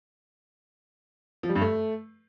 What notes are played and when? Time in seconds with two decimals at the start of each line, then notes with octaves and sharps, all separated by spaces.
1.43 F3
1.49 G3
1.55 G2
1.61 A3